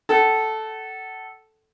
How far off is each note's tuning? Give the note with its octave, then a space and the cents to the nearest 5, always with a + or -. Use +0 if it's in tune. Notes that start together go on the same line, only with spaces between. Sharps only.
A4 -5 F#5 +35